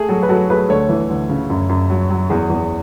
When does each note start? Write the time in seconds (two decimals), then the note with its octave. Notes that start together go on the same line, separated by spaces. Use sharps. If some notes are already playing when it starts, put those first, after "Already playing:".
Already playing: A3 G#4
0.09 F#3 F#4 A4
0.22 B4
0.29 F#3 F#4 A4
0.49 A3 G#4 B4
0.69 D2 A4 C#5
0.89 E3
1.09 D2
1.29 C#3
1.50 F#2
1.69 F#2
1.90 F#3
2.10 F#3
2.30 E2 G#4
2.50 E2